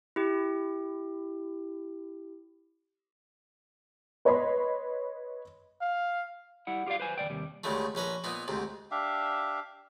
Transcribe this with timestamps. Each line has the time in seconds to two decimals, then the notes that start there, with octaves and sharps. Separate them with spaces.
0.16 E4 G4
4.25 B4 C#5 D#5 B5 C6
5.81 F5
6.67 G3 E4 F#5
6.86 F4 G4 B4 D5 F5
7.00 B4 C5 G#5
7.18 D#2 D#3 D5 G5
7.30 D#2 C3 G3
7.64 D2 G2 C#3 G#3 A3
7.95 A#1 C#4 B4 A#5
8.24 A#2 B3 D#4
8.48 D2 G#2 C3
8.91 D4 G4 E5 F5